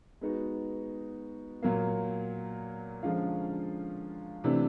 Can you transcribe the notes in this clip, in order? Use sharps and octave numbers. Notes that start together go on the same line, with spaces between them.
G#3 B3 D#4 F#4
A#2 F#3 A#3
D3 F3 G#3 C#4 F4
C3 E3 A3 D4